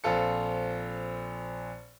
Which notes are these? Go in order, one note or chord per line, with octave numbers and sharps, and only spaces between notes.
A#1 C4 F4 A4 C#7